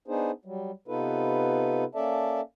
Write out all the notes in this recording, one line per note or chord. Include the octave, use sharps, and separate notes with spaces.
B3 D4 D#4 G#4 C5
F#3 G3
C3 B3 D#4 F4 A4 B4
A#3 C#4 A4 D5 E5 A5